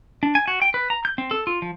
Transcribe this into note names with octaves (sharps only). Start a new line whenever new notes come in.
D4
G#5
F#4
G5
B4
A#5
G6
C4
A4
F4
F3